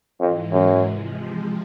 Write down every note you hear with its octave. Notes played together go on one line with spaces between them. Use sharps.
F2 G#2 E3 G#3
F#2
C3 F3 G#3